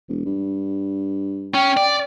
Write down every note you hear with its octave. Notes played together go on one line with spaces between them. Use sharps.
E1
G2
C#4 G5
D5